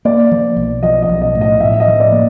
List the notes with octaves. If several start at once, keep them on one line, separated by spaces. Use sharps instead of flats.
A#3 D5
F3
B1
F3 D#5
D#5
B1
D#5
A2
D#5
A2 E5
D#5
F3
D5
A#3